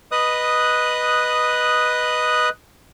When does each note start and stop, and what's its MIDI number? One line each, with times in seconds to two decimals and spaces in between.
0.12 2.49 71
0.12 2.49 75
0.12 2.49 87
0.12 2.49 90